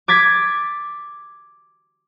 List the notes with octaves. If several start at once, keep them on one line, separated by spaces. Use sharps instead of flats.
D6 G#6 A6 B6